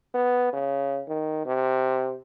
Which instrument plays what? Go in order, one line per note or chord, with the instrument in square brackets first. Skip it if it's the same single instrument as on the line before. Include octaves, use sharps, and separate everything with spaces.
[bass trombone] B3
C#3
D#3
C3